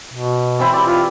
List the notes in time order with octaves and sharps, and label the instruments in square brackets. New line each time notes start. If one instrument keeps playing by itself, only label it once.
[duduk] B2
[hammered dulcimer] E3 C4 E4
G4 D5
[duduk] F4